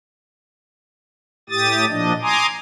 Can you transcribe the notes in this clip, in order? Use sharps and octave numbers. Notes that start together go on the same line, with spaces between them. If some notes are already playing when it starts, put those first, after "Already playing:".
A2 G4 D#6 A6
A#2 F3 D4 D#5
G#5 A#5 C6 D6 D#6